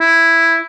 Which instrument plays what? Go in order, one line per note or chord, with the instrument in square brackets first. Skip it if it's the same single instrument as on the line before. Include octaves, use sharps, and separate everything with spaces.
[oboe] E4